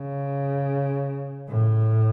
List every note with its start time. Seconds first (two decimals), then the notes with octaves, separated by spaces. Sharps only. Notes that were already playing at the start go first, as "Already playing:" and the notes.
Already playing: C#3
1.48 A2